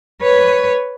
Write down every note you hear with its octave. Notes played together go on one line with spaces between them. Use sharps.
B4 C#5